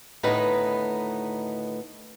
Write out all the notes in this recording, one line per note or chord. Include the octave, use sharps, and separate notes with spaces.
D2 A2 D#3 B3 D#4 B4